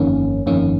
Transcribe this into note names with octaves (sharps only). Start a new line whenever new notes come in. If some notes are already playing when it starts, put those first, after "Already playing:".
Already playing: G1 F2 D#3 A#3 C#4
G1 F2 D#3 A#3 C#4